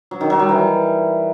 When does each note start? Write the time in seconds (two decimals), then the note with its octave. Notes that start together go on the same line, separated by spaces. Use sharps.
0.11 F#3
0.21 D#3
0.30 F#3
0.39 G3
0.49 E3